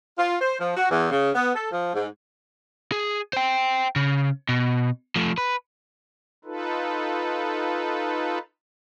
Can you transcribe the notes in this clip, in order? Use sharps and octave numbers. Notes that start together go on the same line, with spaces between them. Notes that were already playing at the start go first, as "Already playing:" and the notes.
F4
C5
F3
F#4
E2
C#3
B3
A4
F3
G#2
G#4
C5 G5
C#3
B2
F3 A3
B4
D#4 F4 A4 B4